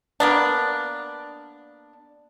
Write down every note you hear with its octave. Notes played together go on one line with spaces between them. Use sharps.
A#3 B3 D4